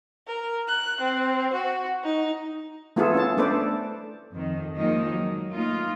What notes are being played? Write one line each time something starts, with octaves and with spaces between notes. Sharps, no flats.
A#4
F#6
C4
F#4
D#4
A3 B3 E4 F4 G#4 A4
C#4 A5
A3 D4 A4 B4 C5 D5
F2 D#3
D#3 F3 G#3 A#3 D#4
F#3
A3 A#3 D#4 F4